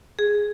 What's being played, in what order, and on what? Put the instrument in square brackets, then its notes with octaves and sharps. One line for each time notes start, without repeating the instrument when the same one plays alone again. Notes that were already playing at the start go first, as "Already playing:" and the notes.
[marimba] G#4